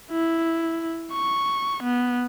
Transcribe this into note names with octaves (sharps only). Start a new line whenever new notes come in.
E4
C#6
B3